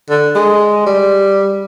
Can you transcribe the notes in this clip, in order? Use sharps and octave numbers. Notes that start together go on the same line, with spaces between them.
D3
G#3
G3